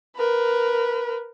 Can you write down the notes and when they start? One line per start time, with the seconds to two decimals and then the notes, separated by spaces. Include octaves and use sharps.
0.16 A#4 B4